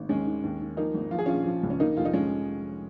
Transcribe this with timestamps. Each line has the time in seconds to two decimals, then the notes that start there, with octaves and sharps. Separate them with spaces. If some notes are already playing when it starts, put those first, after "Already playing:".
Already playing: G#1
0.09 D#2 G#3 C#4
0.26 D#3
0.43 D#2
0.61 D#3
0.77 F3 A#3 D#4
0.94 G#1
1.11 F3 F4
1.19 G#4
1.26 A#1 C#4 F4
1.46 F3
1.63 C#2
1.70 C#4
1.80 D#3 A#3 D#4
1.97 F1 F4
2.05 D#4
2.13 F3 G#3 C#4